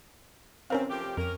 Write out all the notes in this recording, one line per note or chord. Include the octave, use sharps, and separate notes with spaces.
C3 E3 C4 C#4 A#4 F5
F3 A3 G4
F2 C#4 A#4 D#7